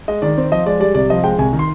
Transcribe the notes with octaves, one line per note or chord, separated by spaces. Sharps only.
G#3 D#5
D#3 D5
C4
F3 D#5
G#3 D5
G3 D5
C2 D5
F3 D#5
G#3 G5
C2 G#5
D#3
C6